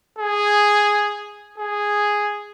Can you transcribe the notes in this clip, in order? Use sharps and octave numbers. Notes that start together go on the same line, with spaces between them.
G#4
G#4